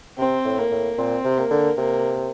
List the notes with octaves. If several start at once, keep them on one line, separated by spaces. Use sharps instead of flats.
C3 C4
A2
A#3
A2
A#2 C4
C3
A#3
D3
C3 A#3